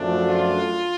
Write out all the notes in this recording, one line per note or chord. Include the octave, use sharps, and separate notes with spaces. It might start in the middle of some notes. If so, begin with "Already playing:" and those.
Already playing: F#2 F3 A3 D4
F4